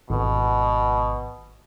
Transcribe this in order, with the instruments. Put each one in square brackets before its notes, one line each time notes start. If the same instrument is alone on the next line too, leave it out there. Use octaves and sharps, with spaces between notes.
[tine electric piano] G#1 [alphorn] B2